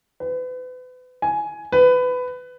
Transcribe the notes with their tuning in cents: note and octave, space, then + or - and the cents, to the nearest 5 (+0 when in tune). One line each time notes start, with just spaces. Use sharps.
B4 +35
G#5 +10
B4 +20